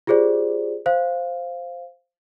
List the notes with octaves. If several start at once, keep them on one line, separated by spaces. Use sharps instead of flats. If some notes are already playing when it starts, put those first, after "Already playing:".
F4 G4 G#4 C5 D5
C5 F5